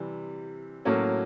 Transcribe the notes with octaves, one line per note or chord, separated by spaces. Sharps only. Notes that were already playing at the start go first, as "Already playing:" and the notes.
Already playing: C3 E3 G3
A2 F#3 A#3 C#4 F#4